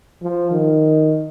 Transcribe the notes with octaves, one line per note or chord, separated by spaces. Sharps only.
F3
D#3